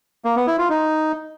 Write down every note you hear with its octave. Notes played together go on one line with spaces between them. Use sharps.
A#3
B3
E4
F4
D#4